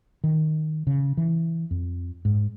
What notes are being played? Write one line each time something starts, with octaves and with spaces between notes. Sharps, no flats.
D#3
C#3
E3
F2
G#2